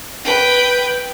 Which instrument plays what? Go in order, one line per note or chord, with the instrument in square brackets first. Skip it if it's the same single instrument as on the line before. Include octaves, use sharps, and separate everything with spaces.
[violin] B4 G5